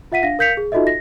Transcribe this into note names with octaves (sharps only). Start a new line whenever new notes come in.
F4 E5 F#5 B6 D#7
D4 F5 A#6
A#4 F5 G6 B6 C#7 F7
G#4
D#4 F4 F#4 A4 D#5 E5
A#6